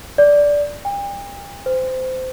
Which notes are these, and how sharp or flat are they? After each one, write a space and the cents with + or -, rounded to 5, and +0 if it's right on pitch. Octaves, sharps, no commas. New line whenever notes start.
D5 -10
G5 +40
C5 -20